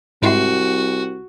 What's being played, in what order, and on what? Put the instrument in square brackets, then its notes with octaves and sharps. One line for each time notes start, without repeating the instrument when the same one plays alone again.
[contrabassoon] C2 [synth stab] G#2 E4 C6 [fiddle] F#4